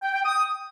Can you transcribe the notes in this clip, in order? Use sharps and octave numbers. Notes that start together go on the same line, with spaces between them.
G5
G5
D#6